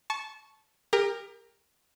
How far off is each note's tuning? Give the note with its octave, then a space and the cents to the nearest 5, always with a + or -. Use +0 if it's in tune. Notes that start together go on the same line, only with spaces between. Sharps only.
A5 -20 C#6 +0
G4 +35 A#4 +0